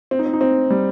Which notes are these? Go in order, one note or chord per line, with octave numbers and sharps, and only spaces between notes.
C4
D#4
C4
D#4
C4
G3